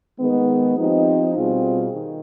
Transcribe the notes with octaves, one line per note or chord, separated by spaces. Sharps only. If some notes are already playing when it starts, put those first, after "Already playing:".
D#3 G#3 B3
F3 C4 D#4 G4
B2 G3 C4 F4 G#4
D#3